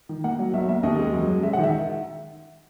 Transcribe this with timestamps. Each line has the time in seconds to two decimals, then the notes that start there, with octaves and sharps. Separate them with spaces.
0.09 D#3
0.24 A#3 F#5
0.39 F#3
0.53 B1 E5
0.69 A#3 E5
0.83 D#2 D#5
0.98 G#3
1.13 F#2
1.28 F#3
1.43 G#3 E5
1.53 F#5
1.58 D#3
1.63 E5